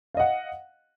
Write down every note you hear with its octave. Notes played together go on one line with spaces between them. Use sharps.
D#5 F5 F#5